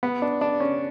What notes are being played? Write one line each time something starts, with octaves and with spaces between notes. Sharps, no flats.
B3
D4
D4
C#4